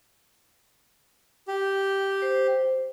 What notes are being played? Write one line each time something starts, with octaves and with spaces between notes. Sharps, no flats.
G4
C5